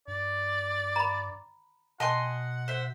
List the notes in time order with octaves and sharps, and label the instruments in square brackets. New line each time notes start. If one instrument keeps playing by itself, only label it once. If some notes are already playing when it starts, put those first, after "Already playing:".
[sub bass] G2 [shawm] D5
[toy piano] A#5 B5
[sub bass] B2 [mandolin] D#5 G#5 C6 [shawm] F#5 [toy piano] A5
[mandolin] C5 E5